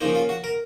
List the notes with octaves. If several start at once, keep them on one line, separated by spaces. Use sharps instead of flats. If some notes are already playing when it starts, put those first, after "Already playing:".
C#3 F3 A#3 D#4
F4
F#4
A#4